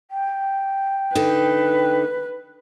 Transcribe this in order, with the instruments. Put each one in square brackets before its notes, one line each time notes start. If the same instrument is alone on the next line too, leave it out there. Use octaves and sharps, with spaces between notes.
[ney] G5
[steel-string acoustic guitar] D3 D#4 [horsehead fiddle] B4